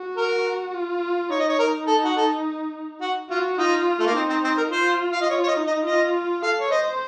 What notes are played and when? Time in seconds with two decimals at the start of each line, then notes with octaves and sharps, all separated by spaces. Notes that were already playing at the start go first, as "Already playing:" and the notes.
Already playing: F#4
0.17 A#4
0.74 F4
1.30 D#4 C#5
1.39 D#5
1.49 C#5
1.59 A#4
1.87 A4
2.04 F#4
2.16 A4
3.01 F#4
3.29 F4 F#4
3.58 D#4 F4
3.99 A3
4.06 A#3
4.15 C4 D#4
4.29 C4
4.44 C4
4.57 A#4
4.72 F4 C5
5.13 F5
5.21 D#5
5.29 F4 C#5
5.44 C#5
5.48 D#5
5.57 D#4
5.67 D#5
5.85 F4 D#5
6.42 A4 F5
6.60 C#5
6.71 C5 D#5